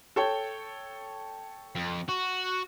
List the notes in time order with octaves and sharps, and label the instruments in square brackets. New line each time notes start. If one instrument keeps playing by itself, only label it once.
[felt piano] A4 C#5 G5
[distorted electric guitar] F2
F#4